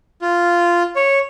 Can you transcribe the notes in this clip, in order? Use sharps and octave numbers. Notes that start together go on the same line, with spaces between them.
F4
C#5